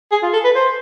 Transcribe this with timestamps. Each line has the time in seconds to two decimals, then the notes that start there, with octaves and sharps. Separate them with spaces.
0.12 G#4
0.23 F4
0.34 A4
0.44 B4
0.55 C5